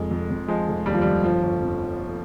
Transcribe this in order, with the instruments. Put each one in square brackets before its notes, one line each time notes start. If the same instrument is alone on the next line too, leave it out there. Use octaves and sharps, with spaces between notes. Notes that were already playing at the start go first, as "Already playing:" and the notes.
Already playing: [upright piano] F1 F2 [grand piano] G#3
[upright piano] F2
F2
[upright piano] F3 [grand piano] G#3
[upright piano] F1
[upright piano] D#2 [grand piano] G3
[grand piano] F3
[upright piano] F1 [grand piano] G3
[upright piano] G1 [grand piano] F3
[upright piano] G1
F2